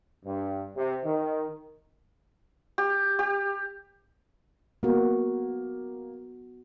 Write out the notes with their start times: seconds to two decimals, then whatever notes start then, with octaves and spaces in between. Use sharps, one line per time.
0.25 G2
0.76 C3
1.05 D#3
2.78 G4
3.19 G4
4.83 A#3 B3 F#4